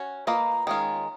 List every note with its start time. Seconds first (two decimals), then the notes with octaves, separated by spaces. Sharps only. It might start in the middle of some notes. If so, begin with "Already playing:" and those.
Already playing: C#4 F#4
0.27 A#3 F4 B4 D#5
0.67 D#3 G#3 C#4 F4